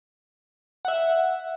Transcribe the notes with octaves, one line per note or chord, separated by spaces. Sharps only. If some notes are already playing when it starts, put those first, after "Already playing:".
E5 F#5